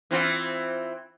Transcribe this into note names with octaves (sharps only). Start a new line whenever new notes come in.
E3 C4 F4